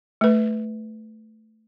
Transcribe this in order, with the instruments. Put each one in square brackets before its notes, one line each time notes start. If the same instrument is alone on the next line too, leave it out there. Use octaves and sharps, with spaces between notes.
[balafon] A3 B4